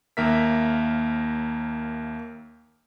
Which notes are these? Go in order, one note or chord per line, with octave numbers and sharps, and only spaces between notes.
D#2 A#3 A#4 E5 B6